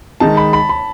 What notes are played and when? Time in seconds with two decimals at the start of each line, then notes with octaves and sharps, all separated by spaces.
0.20 D#3 G#3 D#4 A5
0.37 B5
0.53 B5
0.69 B5